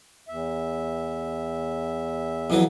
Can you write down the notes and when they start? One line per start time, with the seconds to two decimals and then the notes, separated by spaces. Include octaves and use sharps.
0.28 E2 E5
2.50 F2 E3 F#3